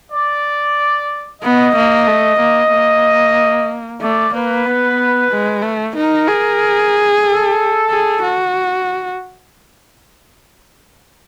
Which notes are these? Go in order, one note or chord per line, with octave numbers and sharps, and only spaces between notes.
D5
B3 D#5
A#3
A3
A#3
A#3
A3 D5
A#3 B4
B3
G#3
A3
D#4 A#4
G#4
A4
G#4
F#4